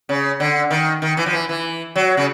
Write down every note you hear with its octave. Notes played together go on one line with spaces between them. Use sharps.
C#3
D3
D#3
D#3
E3
F3
E3
E3
F#3
C#3